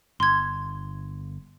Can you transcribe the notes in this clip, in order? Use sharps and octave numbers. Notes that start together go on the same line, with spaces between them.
G1 C6 G#6